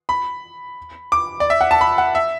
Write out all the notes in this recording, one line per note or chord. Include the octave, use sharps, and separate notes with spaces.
B5
D6
D5
E5
F#5
A5
B5
F#5
E5